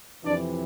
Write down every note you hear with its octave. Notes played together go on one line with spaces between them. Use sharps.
F2 C3 E3 D4 D5